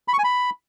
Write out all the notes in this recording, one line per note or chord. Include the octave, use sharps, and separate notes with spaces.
B5
C#6
G#5
B5